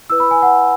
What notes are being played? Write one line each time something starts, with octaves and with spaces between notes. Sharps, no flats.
E4 B4 E6
B5
G#5
F#5